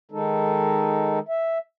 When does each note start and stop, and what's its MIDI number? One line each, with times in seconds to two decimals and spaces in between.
0.11 1.19 51
0.11 1.19 56
0.11 1.19 63
0.11 1.19 69
1.29 1.58 76